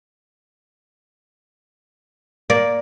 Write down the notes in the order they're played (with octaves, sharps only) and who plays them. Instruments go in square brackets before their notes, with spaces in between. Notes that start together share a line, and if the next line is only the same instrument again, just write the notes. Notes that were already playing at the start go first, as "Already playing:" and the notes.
[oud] A#3 [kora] D5